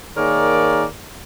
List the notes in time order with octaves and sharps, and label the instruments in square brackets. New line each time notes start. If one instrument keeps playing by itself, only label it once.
[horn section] D#3 A#3 G#4 A#4 C#5 D5